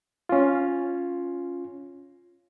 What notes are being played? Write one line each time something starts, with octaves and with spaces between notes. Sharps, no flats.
C#4 F4